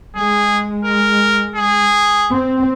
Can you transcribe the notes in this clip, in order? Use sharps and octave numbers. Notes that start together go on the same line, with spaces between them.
G#3 G#4
A#4
G#4
C4